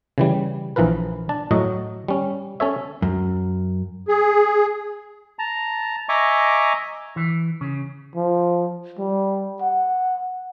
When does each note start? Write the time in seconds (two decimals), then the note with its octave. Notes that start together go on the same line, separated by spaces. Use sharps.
0.18 C#3 E3 G3
0.76 A#1 E3 F3 A#4 B4
1.29 D4 A5
1.51 A2 F#3 F#4 D#5
2.08 G3 C#4
2.60 C#4 A4 C#5 E5
3.02 F#2
4.08 G#4
5.39 A5 A#5
6.09 D#5 E5 G#5 A#5 C#6 D6
7.16 E3
7.61 C#3
8.15 F3
8.98 G3
9.61 F#5